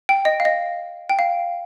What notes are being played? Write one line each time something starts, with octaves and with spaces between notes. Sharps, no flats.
G5
D#5
F5
D#5
G5
F5